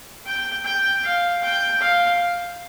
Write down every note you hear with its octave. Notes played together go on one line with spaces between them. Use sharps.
G5
G5
F5
G5
F5